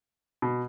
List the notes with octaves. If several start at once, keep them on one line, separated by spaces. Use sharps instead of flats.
B2